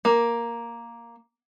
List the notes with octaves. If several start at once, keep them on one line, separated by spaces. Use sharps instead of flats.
A#3